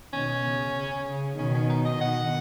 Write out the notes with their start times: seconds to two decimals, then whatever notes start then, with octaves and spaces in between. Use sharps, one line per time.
0.12 B2 D#3 C#4
0.44 C#3
0.75 C#3
1.07 C#3
1.38 B2 D#3 C#4
1.54 C#4
1.69 D#4
1.85 D#5
2.00 B2 D#3 F#5